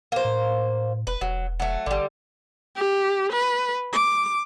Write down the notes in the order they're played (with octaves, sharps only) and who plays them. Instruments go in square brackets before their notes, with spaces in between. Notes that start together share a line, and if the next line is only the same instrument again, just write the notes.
[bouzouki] A#3 C5
[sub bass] A2
[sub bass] F1 [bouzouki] B4
[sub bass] E1 [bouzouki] F#3
[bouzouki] F#3 A3
[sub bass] G#1 [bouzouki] D3 G3
[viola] G4
B4
D6